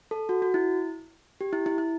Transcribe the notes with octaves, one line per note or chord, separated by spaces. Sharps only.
A4
F#4
F#4
E4
G4
E4
E4
E4